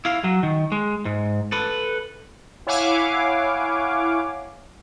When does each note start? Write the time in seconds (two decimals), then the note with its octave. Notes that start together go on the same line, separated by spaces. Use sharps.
0.05 E4 F5
0.24 F#3
0.43 D#3
0.72 G#3
1.05 G#2
1.52 A4 B4
2.67 E4 C#5 F5 F#5 G#5 D6